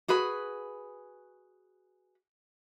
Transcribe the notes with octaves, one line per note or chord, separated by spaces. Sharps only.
F#4 G#4 B4 B5